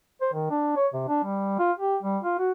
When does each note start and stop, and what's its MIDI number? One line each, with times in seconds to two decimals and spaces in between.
0.21 0.29 72
0.34 0.50 51
0.50 0.74 62
0.76 0.87 73
0.94 1.04 48
1.08 1.24 62
1.24 1.57 55
1.59 1.72 65
1.79 1.96 67
2.02 2.18 55
2.23 2.36 65
2.38 2.51 66